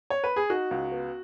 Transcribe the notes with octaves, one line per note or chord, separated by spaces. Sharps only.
C#5
B4
G#4
D#4 F#4
C#2
B3